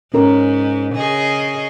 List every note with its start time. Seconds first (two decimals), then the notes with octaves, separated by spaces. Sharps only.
0.14 G#2 C#4 A#4
0.95 C#3 G#4 D#5